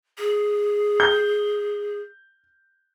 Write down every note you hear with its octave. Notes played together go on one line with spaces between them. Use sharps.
G#4
G6